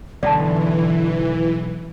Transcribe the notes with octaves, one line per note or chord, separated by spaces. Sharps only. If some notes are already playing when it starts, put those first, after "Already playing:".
B1 G#2 D3 E3 D5 G5 A5